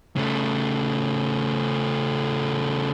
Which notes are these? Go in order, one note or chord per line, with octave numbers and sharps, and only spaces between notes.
C#3 A3